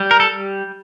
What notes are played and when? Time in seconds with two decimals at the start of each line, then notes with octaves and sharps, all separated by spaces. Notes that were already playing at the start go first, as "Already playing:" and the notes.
Already playing: G3
0.11 A#4
0.20 A4